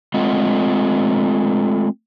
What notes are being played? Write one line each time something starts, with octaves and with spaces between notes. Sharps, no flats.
G#3 A3 C4 F4 D#5 F#5